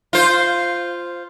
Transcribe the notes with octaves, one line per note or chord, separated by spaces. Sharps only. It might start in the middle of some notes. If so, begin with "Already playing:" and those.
F4 C5